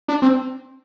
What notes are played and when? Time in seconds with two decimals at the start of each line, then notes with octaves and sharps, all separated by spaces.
0.08 D4
0.22 C4